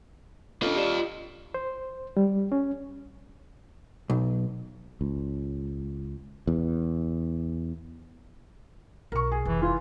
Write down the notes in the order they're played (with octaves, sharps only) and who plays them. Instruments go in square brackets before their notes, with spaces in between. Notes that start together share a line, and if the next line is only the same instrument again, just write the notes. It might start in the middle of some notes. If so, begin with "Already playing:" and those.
[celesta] D4 A4 [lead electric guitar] F4 D#5
[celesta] G4 D5 E7
[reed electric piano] C5
G3
C#4
[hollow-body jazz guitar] B1
[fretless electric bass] C#2
E2
[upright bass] B1 [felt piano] A#4 C#6
[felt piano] G#4
[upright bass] F1 [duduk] E3
[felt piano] E3 [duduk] F4